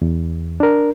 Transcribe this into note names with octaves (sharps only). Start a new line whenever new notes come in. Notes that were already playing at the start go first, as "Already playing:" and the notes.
E2
D4 A#4